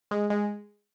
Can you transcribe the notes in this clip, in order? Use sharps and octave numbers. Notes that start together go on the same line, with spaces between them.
G#3
G#3